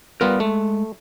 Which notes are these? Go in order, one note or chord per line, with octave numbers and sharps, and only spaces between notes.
G3 B3 F4 A#4 B4
G#3 A3